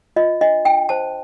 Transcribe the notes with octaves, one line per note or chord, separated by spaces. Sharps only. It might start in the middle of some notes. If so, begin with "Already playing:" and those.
F4 D#5
D4 D#5
D4 G5
C5 A5